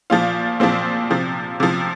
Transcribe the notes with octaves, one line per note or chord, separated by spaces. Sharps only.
A#2 F3 F4
A#2 F3 C4
C3 F3
C3 F3